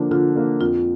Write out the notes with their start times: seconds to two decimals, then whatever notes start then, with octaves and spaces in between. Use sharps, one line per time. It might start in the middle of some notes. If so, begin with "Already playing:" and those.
Already playing: D3 F3 A#3 D4
0.11 D3 F4
0.36 F3 A#3 D4
0.60 F2 F4